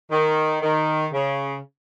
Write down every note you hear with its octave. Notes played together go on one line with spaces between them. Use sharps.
D#3
D#3
C#3